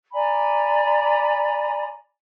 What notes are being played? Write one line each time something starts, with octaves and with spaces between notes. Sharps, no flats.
D5 G#5 A#5 B5